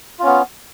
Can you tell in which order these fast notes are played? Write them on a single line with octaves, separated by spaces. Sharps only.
F4 C#4 B3